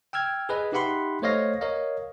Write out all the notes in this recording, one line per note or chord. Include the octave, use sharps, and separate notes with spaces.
G5 E6 F6 G#6
G#4 B4 D#5
D#4 G4 E5 F#5 B5 C6
A3 C5 C#5 D#5 F5 A#6
A#4 C#5 D#5 F5